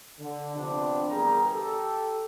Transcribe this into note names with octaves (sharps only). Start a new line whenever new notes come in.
D3
C3 F3 B3 C4 D4
G1 E2 G3 G#4 A#4 A#5
G4 A4